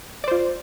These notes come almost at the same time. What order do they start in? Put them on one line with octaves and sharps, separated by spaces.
D5 C5 F4